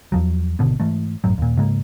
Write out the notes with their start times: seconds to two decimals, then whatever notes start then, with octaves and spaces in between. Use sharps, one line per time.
0.12 E2 F3 F#3
0.59 G#1 B2 D3 B3
0.80 G#2 E3 A3
1.24 G#1 F#2 A2 F#3
1.38 D#2 A#2
1.57 G#2 C#3 G#3 A#3